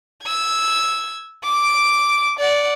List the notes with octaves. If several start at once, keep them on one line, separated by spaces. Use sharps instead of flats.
E6 G#6
D6 D7
D5 F#5